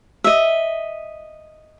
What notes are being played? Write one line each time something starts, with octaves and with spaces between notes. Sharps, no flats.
D#5 E5